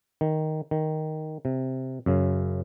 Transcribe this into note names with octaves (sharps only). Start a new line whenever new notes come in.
D#3
D#3
C3
F#2 C#3